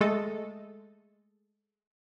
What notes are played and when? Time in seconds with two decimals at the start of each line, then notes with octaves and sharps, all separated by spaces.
0.01 G#3 A3 A4 D#5